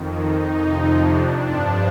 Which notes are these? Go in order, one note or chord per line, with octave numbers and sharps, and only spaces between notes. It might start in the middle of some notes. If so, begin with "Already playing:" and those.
Already playing: F2 D#3
D#4
F2 C3 F3
D4
G2 F3